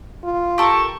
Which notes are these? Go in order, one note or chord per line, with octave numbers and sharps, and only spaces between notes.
F4
G4 A4 A#4 C#6